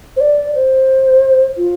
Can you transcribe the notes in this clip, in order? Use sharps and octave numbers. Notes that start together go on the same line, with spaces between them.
C5
D5
C5
F4